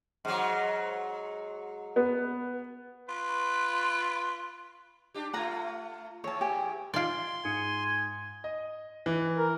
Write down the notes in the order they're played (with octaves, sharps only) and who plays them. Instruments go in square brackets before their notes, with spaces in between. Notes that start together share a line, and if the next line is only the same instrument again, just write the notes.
[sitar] G#2 F#3
[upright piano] B3
[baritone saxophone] F4 [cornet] B4
[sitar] D4 G4
[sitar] A3 F4 [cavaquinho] F#5 A#5
[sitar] E2 [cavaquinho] C#5 A5
[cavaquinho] G4 G#5
[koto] F4 D5 [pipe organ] C6 [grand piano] G#6 D7
[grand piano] G#2 D#6 C#7 [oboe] G#5
[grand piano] D#5
E3
[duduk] A#4